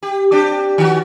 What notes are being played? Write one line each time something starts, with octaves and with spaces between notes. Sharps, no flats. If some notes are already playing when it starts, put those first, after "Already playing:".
G4
C4 D4 G4
D#3 F#4